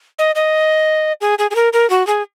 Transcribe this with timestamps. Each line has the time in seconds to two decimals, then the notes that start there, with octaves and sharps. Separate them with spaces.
0.19 D#5
0.35 D#5
1.21 G#4
1.39 G#4
1.51 G#4
1.55 A#4
1.73 A#4
1.90 F#4
2.07 G#4